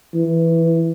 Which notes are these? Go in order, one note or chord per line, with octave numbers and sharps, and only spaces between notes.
E3